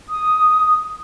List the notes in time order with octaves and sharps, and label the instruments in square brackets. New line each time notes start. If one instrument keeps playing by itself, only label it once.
[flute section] D#6